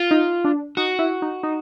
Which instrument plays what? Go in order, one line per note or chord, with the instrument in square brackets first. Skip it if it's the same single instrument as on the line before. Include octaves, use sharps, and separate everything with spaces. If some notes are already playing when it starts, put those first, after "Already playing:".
Already playing: [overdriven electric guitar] F4
[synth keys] D#4
D4
[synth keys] D#4 [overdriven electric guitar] F#4
[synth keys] E4
D#4
D#4